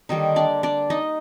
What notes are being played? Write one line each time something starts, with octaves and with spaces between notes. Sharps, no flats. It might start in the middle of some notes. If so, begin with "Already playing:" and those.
D3 D#3 G3 A#3 D#4
D4 D5
D4 D5
D#4 D#5